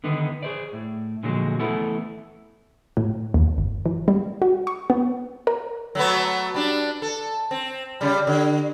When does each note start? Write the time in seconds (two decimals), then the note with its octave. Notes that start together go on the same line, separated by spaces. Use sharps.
0.04 D3 D#3 B3 D#4
0.43 G#4 C5 D5
0.73 A2
1.23 A#2 D3 F3 F#3 G#3
1.60 E3 A3 B3 E4 A4
2.97 A2
3.34 D#2
3.58 G1
3.86 E3
4.08 G3
4.42 F#4
4.67 C#6
4.90 B3
5.47 A#4
5.95 F#3 A3 B3
6.54 G3 D4
7.02 A4
7.51 C4
8.01 C#3 G3
8.27 D3